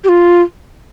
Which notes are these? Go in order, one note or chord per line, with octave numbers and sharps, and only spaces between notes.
G4
F4